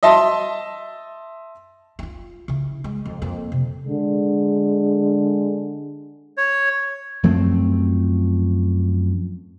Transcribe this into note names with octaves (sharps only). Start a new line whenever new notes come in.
D#5 E5 A5 C6
E4 F4
C#3 E4
G#3
F2
F2 A#3
C3
D3 G#3
C#5
F#2 F3 A3 C4